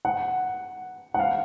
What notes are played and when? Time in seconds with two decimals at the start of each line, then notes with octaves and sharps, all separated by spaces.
0.05 F#5
1.14 F#5
1.19 F5